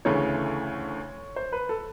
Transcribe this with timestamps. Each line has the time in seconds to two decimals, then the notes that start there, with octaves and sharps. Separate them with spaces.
0.05 D2 C#3 E3 A3 C#5
1.36 C5
1.52 B4
1.69 A4